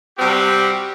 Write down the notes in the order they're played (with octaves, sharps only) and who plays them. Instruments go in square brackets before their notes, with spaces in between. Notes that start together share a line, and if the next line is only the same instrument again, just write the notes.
[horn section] C3 G3 C4 F#4 G4